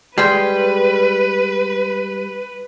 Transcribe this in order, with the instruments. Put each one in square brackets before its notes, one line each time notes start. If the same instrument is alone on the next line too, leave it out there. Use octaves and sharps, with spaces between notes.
[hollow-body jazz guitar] G3 G#3 [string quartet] B4 [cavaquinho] G5 C6